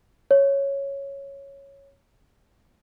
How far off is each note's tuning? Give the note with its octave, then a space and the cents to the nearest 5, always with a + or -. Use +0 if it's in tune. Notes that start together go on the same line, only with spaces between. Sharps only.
C#5 -5